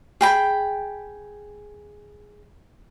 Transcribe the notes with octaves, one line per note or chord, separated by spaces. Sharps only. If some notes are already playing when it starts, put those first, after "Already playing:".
G#4 G5 B5